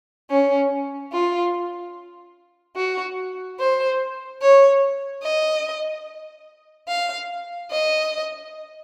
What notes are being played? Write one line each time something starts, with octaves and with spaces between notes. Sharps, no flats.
C#4
F4
F#4
C5
C#5
D#5
F5
D#5